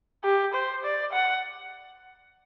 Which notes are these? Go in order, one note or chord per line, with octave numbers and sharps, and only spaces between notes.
G4
C5
D5
F#5